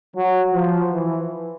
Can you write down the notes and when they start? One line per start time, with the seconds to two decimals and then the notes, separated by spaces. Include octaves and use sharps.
0.15 F#3
0.53 F3
0.92 E3